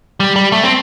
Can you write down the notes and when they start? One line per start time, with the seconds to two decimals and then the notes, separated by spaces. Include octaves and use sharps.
0.20 G3
0.36 G3
0.52 A3
0.63 C4